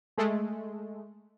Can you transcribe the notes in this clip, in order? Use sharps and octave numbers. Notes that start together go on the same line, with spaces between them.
G#3 A3